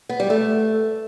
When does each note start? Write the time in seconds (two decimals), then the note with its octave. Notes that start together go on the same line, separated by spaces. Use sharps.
0.09 B3
0.20 G3
0.30 A3